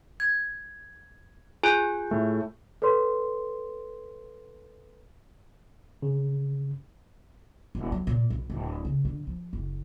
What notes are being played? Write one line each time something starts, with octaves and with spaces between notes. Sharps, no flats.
G#6
F4 G#4 G#5 F#6 G6
A2 A3
A4 B4 C#5 C6
C#3
D#1
F#3
A#2
B1
D1
C#3
D3
F3
F#1